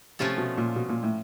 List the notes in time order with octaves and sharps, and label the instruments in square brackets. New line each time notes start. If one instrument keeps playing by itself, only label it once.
[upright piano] C3 [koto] F3 A3 C#4 F4 A4
[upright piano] B2
A#2
B2
A#2
A2